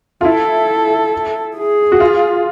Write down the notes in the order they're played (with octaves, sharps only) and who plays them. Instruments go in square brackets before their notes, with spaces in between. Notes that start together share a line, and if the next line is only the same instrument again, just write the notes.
[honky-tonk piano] F4
[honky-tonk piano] E4 [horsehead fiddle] A4
[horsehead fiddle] G#4
[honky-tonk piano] F#4
F4